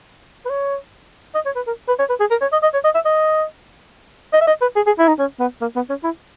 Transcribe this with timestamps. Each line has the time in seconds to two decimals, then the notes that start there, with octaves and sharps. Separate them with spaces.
0.45 B4
0.50 C#5
1.35 D#5
1.45 C#5
1.56 B4
1.67 A#4
1.88 B4
1.99 C#5
2.09 B4
2.20 G#4
2.31 A#4
2.41 C#5
2.52 D#5
2.63 D#5
2.74 C#5
2.84 D#5
2.95 E5
3.05 D#5
4.33 D#5
4.41 E5
4.47 D#5
4.61 B4
4.76 G#4
4.86 G#4
4.99 E4
5.08 D#4
5.19 C#4
5.39 B3
5.61 A#3
5.76 B3
5.90 C#4
6.04 E4